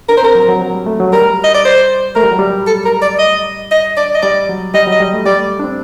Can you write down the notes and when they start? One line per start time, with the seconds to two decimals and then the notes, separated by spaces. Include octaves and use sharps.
0.09 D4 A#4
0.17 C5
0.23 C4 A#4
0.35 F#3
0.48 F#3
0.61 F#3
0.74 G3
0.86 A3
1.00 F#3
1.13 G3 A#4
1.44 D#5
1.54 D5
1.65 C5
2.15 A3 A#4
2.23 G3
2.31 F#3
2.39 G3
2.67 A4
2.85 A#4
3.02 D5
3.19 D#5
3.71 D#5
3.97 D5
4.15 D#5
4.22 G3 D5
4.49 F#3
4.74 G3 D#5
4.87 F#3
4.92 D#5
5.00 G3
5.13 A3
5.26 G3 D5
5.39 A3
5.59 D4
5.64 C4